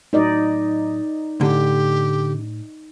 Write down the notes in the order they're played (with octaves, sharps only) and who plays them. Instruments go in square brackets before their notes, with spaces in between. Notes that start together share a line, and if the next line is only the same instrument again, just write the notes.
[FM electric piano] A2 F#3 [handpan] D#4 D5 D#5
[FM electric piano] A2 [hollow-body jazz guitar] D3 [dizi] G4